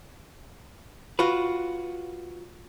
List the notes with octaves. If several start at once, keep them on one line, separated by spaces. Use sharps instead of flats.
F4 F#4 B4